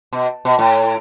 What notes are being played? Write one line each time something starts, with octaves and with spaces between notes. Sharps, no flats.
B2
B2
A2